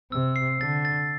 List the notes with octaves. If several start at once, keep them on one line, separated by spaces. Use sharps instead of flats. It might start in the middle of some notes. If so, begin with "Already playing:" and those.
C3 E6
C7
D3 A6
A6